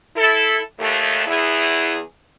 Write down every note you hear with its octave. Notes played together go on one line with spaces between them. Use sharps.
E4 A4
D#2 A3
E2 E4 G#4